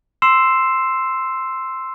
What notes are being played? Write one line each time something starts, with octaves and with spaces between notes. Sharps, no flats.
C6 E6 C7 E7